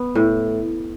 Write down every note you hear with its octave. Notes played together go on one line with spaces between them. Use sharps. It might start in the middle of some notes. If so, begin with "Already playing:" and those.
Already playing: B3
A2